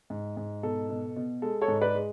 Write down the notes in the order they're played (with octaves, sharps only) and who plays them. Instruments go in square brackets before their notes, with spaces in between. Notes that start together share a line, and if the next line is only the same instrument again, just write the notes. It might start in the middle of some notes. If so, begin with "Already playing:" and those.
[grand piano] G#2
G#2
B2 A4
B2
B2
G#3 A4
A4 C#5
G#2
B4 D5
G#3